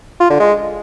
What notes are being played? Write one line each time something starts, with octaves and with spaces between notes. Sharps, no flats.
F4
D3
G#3